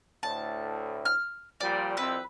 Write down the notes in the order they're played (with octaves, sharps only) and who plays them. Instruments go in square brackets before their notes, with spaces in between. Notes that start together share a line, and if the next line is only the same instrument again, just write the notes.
[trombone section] D2 A2 [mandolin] A5
[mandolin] F6
[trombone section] A#2 F3 G3 [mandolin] D5
[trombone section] C2 F2 C4 [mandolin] B4 E6